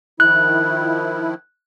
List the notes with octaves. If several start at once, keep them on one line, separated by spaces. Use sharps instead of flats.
D#3 F3 E4 F#6